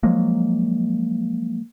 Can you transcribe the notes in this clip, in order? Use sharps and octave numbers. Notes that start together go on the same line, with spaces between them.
F3 F#3 G#3 A#3